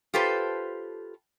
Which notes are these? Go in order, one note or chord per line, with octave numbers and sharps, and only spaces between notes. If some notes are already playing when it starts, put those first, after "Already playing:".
F4 G4 A4 B4 C5